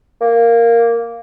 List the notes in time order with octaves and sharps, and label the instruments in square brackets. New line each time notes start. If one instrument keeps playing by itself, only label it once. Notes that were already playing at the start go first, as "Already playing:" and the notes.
[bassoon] A#3